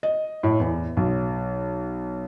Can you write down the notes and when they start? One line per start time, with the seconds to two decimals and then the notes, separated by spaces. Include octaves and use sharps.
0.03 D#5
0.43 A2
0.60 E2
0.97 B1